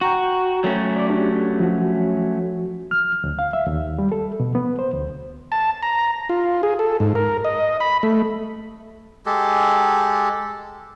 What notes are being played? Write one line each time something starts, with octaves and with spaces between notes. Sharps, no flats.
F#4 G5 A#5 C#6
F#3 A3 C#4
D5 D6
D4 G4
F3 F#4
F6
D2
F5
E5
D#2
G3
A4
B2
B3
C5
D2
A5
A#5
F4
G#4
A4
G#2
A#4
D#5
B5
A3
G#3 G4 A4